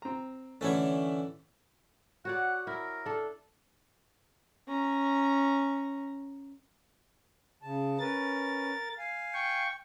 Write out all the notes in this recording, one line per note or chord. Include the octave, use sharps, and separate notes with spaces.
C4 A#5
D3 E3 A3 C#4 C#5
F#4 C#5 D5 F#5
E4 A#4
D4 A4
C#4 A#5
C#3 A5
C#4 A#4 B4 A6
F5 G#5
G5 C#6